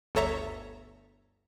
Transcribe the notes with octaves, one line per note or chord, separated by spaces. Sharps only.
G1 D2 A4 C#5 E5 A#5